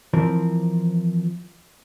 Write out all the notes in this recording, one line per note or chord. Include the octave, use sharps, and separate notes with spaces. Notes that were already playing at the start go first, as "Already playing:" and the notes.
E3 F3 C4 A#4